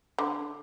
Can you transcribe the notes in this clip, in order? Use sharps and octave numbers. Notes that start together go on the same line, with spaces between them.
D3